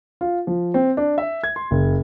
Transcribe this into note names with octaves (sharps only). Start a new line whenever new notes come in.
F4
F3
C4
D4
E5
G#6
C6
F#1